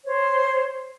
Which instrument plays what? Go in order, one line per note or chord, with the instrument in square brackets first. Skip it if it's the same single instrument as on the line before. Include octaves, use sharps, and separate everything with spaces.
[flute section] C5 C#5